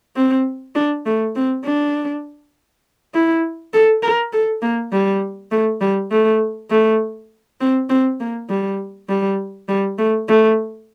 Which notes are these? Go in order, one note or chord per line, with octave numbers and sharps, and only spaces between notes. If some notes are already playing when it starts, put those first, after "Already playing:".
C4
D4
A3
C4
D4
E4
A4
A#4
A4
A#3
G3
A3
G3
A3
A3
C4
C4
A#3
G3
G3
G3
A3
A3